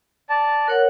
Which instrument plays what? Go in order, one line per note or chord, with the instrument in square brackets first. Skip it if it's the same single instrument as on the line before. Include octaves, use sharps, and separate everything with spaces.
[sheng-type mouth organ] D5 A5
[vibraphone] A#4 C#5 F#5 [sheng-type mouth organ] F#6